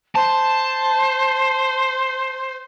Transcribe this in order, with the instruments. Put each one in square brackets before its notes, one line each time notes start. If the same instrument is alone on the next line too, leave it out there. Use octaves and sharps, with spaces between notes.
[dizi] C5 [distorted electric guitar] A5